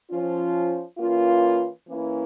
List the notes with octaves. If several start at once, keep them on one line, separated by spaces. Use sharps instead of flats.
F3 C#4 F4
E3 A#3 C#4 F4
E3 A#3 C#4 E4